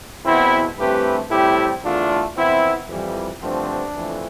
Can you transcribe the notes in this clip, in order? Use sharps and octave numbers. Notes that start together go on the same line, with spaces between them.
E2 B2 B3 C4 E4
G2 E3 A3 C4 G4 B4
A2 G3 C4 E4 G4
E2 D3 A3 D4 F4
F2 E3 B3 C4 E4
F2 E3 G3
G2 D3 F3 A3 C4 D4
F2 E3 A3